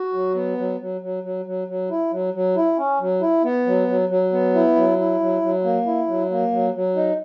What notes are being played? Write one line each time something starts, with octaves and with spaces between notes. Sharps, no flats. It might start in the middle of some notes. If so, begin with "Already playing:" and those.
Already playing: F#4
F#3
B3
F#3
F#3
F#3
F#3
F#3
F#3
E4
F#3
F#3
E4
C#4
F#3
E4
B3
F#3
F#3
F#3
B3
E4
F#3
E4
F#3
F#3
A#3
E4
F#3
A#3
F#3
F#3
D#4